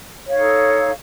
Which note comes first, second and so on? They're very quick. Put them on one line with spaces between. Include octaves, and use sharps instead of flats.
C#5 F5 D#4 A4